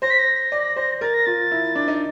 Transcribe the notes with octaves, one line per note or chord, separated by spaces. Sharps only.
C5 A#6
B6
A#6
D5
C5
A#4 A6
A#6
F4 A6
E4
D4
D#4